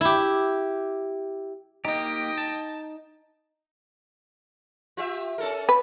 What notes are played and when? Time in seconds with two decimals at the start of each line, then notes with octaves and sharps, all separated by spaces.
0.01 E4 G4
1.85 A#3 D#4 G4 D#5 G5
2.38 A5
4.97 F4 G4 E5
5.38 C#4 A4 A#4
5.69 B4